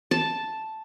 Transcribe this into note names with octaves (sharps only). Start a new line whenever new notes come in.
A5